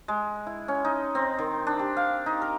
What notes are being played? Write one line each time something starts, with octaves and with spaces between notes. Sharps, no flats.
G#3
E4
C#4
D#4
C4
D#3
D4
G4
F5
D#4
A#4